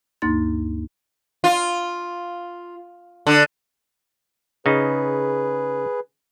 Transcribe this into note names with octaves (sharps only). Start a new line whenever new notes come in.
D2 G2 A#3 D#4 C6 A6
F4
D3
C#3 D#4 G#4 B4